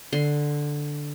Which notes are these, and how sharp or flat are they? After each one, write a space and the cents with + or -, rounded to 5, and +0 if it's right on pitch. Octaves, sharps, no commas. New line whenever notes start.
D3 +0 C6 +0